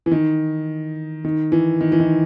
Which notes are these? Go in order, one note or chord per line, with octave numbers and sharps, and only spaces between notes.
E3
D#3
D#3
E3
D#3
E3
D#3